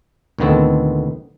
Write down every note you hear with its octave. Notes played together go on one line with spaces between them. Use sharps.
D2 A#2 D#3 B3 C4 A4